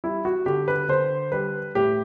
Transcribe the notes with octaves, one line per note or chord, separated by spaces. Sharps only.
G3 E4
F#4
D3 G4
B4
D3 C5
G3 B4
A2 G4